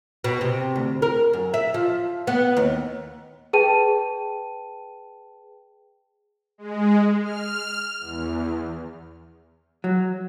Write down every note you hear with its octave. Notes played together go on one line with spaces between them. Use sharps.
B2
C3
D2
A#4
F#2
E5
F3
B3
D#2
G#4 B4 G5 A5 D#7
G#3
F6
E2
F#3